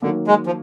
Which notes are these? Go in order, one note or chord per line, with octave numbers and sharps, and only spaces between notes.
D3 D#3 F#3 A#3
G#3
F3